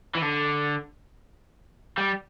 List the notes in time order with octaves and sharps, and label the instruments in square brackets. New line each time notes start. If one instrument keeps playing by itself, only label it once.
[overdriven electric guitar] E3
D3
G3